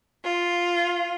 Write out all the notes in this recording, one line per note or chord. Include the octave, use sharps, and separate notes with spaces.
F4